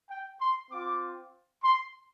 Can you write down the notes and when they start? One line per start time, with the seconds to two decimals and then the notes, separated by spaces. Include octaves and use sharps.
0.09 G5
0.40 C6
0.71 C4 F4 D6
1.63 C6